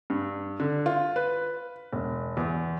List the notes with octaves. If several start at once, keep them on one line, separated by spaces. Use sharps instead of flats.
G2
D3
F4
B4
E1
E2